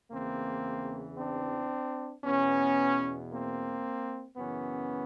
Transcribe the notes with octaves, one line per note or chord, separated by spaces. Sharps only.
E2 C#3 E3 A#3 C4
C4 D4
E2 B2 B3 C#4
A#3 C4
F#2 C#3 E3 B3 C#4